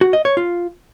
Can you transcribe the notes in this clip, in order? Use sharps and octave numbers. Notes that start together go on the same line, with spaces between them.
F#4
D#5
C#5
F4